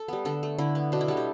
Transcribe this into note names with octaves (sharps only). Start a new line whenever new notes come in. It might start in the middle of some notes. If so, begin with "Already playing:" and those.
Already playing: A4
G3 B3
D3 A4
A3
D3 E4
B3
B2 D4
E4
G3 B3 A4
G4